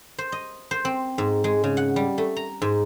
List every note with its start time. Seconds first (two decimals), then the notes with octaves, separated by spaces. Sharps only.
0.19 C5
0.32 D#5
0.71 C5
0.85 C4
1.18 G#2
1.44 G#3
1.64 C#3
1.77 F#5
1.96 G3
2.18 A3
2.36 A#5
2.62 G#2